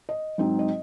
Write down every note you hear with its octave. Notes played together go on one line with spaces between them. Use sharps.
D#5
G#2 F#3 C4 D#4
D#5